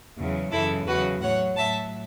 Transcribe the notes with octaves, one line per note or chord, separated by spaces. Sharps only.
E2 C#3 F#3
F#2 C#3 E3 E4 A4
E2 C#3 F#3 F#4 B4
A2 F#3 C#5 F#5
A2 F#3 E5 A5